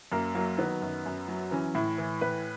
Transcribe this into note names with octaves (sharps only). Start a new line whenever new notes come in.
F#2 A#3
F#3 A#3
D#3 B3
F#2
F#2
F#3
E3 C#4
A2 E4
E3
A2 B4